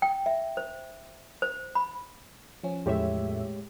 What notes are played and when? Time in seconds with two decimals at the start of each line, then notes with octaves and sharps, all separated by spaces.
0.02 G5
0.26 E5
0.57 C5
1.42 C5
1.75 B5
2.63 F3 C#4
2.86 E2 A2 G#3 G4 C#5 E5